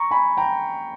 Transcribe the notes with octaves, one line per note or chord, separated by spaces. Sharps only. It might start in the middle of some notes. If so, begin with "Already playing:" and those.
Already playing: A#5 C#6
G#5 B5
G5 A#5